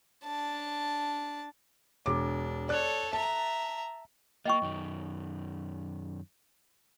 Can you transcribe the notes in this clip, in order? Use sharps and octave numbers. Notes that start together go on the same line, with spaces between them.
D4 A5
E1 D4 D6
A4 C#5 D5 F#6
E5 A5 A#5
A#3 D#5 G5 C#6
F#2 D#3